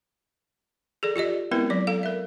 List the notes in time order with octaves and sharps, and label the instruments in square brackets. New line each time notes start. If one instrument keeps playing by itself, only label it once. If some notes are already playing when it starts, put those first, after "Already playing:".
[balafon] G#4 A4 D5
F4 G4 D5 D#5
G#3 B3 C4 E4 A#4 B4
F#3 D5
A4 F5
A#4 E5